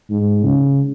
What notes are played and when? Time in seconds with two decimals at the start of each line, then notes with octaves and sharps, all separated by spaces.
0.10 G#2
0.44 C#3